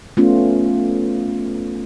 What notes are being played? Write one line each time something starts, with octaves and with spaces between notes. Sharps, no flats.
A3 B3 C#4 F4